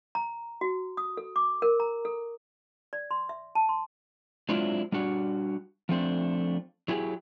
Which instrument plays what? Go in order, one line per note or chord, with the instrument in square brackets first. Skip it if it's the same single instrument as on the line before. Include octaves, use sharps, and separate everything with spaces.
[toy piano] A#5
F#4
D#6
A4
D6
A#4
A#5
A4
D5
C6
E5
A5
C6
[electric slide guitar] F#3 G#3 C4 D4 E4 F4
G3 D4 F#4
F3 A3 C4 D4
F#3 E4 G4 G#4